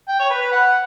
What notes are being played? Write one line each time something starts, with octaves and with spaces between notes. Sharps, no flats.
G5
C#5
B4
B4
F#5